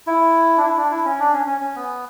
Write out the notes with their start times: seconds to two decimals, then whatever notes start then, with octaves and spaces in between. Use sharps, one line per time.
0.07 E4
0.57 D4
0.63 E4
0.77 D4
0.91 E4
1.05 C#4
1.20 D4
1.33 C#4
1.47 C#4
1.61 C#4
1.75 B3